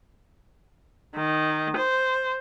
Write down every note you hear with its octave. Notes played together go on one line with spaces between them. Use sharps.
D#3
C5